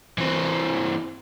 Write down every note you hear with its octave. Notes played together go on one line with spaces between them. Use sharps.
E3 C4